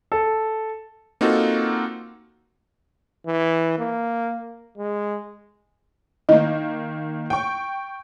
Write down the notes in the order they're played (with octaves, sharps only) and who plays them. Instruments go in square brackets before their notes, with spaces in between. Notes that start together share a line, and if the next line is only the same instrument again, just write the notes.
[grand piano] A4
[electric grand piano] A#3 C4 D#4 F4 F#4 A4
[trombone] E3
A#3
G#3
[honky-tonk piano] D#3 A#3 [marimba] D#5
[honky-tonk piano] G5 C#6